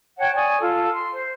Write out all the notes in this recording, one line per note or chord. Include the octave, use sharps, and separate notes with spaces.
C#5 F#5 G5 A5
D5 G#5 C#6 D#6
F4 A4
C6
C5